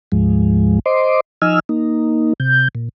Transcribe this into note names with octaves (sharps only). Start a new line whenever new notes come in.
D2 G#2 F3 G#3
C5 D#5 C6 D6
F3 D#4 D#5 G#5 E6 F6
A#3 D#4
C3 G6
A#2